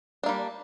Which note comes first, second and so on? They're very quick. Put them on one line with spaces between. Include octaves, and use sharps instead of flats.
D4 A#3 G3